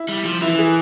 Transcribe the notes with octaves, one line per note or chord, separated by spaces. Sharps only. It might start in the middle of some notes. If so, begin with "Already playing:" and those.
Already playing: E4
G3
F3
E3 E4
G#4